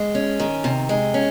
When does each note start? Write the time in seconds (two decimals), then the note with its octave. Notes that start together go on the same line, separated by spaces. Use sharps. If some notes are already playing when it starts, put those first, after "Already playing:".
Already playing: G#3
0.15 C#4
0.40 D#3
0.64 C3
0.89 G#3
1.14 C#4